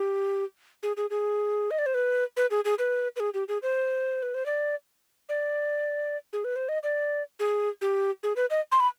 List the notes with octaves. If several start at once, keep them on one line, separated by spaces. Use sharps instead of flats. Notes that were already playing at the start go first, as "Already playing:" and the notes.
Already playing: G4
G#4
G#4
G#4
D#5
D5
C5
B4
B4
G#4
G#4
B4
B4
G#4
G4
G#4
C5
B4
C5
D5
D5
G#4
B4
C5
D#5
D5
G#4
G4
G#4
B4
D#5
C6
B5